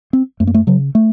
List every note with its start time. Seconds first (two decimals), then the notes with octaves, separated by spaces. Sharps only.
0.13 C4
0.40 F#2 A3
0.47 A#3
0.54 A3
0.67 C#3 F#3
0.95 A3